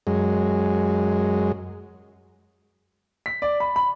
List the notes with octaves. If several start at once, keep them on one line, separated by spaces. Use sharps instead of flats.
F#2 G#3
B6
D5
B5
B5